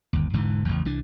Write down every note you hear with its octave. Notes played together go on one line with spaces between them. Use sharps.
G1 D#2
E1 G#2 D3 E3
A1 E2 C#3
C2 E3 D4